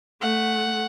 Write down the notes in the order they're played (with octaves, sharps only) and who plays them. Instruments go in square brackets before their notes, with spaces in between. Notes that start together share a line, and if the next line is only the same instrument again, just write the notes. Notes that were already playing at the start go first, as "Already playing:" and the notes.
[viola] A3 [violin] F#5